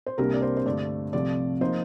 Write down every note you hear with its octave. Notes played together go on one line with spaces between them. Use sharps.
C5
C2 C3 G3 A#3 D4 A#4
D5
C5
C5
G2 D3 A3 D5
C2 C3 F3 A3 D5
F3 A#3 D#4 C5